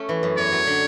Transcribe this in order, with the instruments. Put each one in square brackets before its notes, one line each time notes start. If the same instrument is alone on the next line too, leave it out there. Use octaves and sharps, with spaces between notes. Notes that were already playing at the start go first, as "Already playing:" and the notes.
Already playing: [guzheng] A3 C#4
E3
F#2
[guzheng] E2 [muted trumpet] C#5
[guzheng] F#3
D3